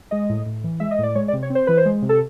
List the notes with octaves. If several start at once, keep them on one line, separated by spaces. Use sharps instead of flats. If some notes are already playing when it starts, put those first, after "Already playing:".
G#3 D#5
A2
A2
E3
G#3 E5
D#5
A2 D5
G#3 C#5
D5
C3
C#5
C4
C5
E3 B4
C5
G#3
C3
A4